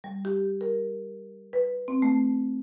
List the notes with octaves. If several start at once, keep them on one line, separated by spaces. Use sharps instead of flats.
G3
G4
A#4
B4
C4
A3